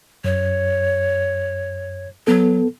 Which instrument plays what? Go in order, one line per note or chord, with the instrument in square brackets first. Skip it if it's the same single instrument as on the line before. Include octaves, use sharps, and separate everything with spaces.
[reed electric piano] F#2 [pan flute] C#5
[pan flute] F#3 [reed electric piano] B3 A4